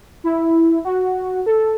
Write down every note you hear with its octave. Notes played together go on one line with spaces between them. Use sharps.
E4
F#4
A4